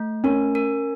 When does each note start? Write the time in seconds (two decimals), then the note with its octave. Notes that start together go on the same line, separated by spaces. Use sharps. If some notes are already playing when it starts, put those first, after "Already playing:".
Already playing: A3
0.24 C#4 A#4
0.55 A#4